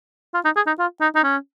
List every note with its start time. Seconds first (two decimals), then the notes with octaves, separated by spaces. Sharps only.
0.34 F4
0.45 D#4
0.56 G#4
0.67 D#4
0.79 F4
1.01 D#4
1.16 D#4
1.23 C#4